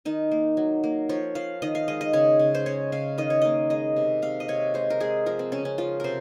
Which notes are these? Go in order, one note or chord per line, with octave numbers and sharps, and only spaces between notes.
D#3 D#4
A#3
F#3
A#3
F3 C#5
F3 F5
D#3 D#5
F5
G#3 D#5
D#5
C#3 C#5
C#3
C5
G#3 C#5
C#3 F5
D#3 D#5
C#5
A#3 D#5
G#3 D#5
C3
C3 F5
D#5
C3 C#5
G#3 C5
A#4
G#3 G#4
F3 A#4
C4
C#3 C#4
C#4
F3 F4
C3 A#4 C5